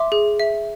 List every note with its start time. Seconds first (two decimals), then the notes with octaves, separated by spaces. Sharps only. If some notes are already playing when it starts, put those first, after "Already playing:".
Already playing: E5 C6 D6
0.12 G#4
0.40 E5